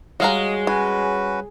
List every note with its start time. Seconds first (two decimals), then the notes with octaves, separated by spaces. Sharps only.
0.20 G3 G#3 F#4 C#5 D#5 F5 A#5
0.67 C#4 F#4 B4 G#5